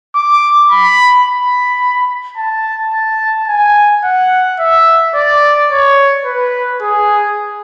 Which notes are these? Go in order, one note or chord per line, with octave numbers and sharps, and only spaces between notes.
D6
B5
B5
A5
A5
G#5
F#5
E5
D5
C#5
B4
G#4